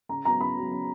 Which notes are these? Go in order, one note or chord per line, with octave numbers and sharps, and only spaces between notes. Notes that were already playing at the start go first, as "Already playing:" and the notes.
C#3 A#5
F#3 B3 A#5
C#3 B5
F#3 B3
C#3